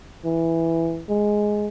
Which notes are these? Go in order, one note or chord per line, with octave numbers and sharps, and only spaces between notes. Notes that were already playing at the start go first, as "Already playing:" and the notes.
E3
G#3